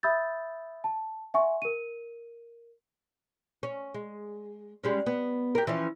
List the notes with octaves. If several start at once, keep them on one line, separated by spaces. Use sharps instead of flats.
E5 B5 D#6 E6 G6 A6
A5
E5 F#5 G#5 C6 C#6
A#4 D#7
C#4
G#3
G3 G#3 C#4
B3
G4 A#4
E3 F3 C#4